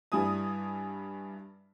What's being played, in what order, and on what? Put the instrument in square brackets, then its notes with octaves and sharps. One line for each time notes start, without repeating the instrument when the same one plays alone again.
[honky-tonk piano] G2 G3 E4 G#5 D#6